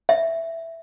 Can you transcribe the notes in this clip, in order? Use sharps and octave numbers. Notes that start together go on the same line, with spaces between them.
E5